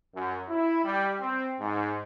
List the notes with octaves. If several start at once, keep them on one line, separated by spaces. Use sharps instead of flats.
F#2
E4
G3
C4
G#2